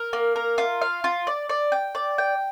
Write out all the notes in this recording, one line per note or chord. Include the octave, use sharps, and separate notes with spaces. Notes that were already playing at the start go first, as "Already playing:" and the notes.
Already playing: A#4
A#3
A#4
F4
F5
F4
D5
D5
G5
D5
G5